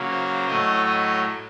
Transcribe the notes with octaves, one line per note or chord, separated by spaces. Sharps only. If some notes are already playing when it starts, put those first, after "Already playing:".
Already playing: C#3 F#3 A#3
C5
A2 F#3 A3 D#5
D#5